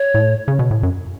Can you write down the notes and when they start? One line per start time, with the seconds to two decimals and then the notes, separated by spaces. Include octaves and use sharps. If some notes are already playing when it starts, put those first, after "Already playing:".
Already playing: C#5
0.14 A2
0.48 C#3
0.59 B2
0.71 A2
0.83 F#2